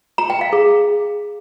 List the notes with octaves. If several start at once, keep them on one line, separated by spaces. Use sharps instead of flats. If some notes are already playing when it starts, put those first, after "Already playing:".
A#5
G5
F5
G#4